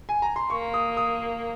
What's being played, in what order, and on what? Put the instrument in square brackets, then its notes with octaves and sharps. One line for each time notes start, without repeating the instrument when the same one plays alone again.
[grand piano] G#5
A#5
C6
[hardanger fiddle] A#3 [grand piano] C#6
[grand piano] D#6
D#6